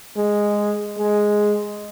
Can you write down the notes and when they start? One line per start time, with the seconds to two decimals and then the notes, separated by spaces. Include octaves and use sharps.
0.17 G#3
0.98 G#3